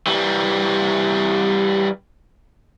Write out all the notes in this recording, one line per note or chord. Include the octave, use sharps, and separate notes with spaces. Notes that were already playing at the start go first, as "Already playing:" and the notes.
E3 G3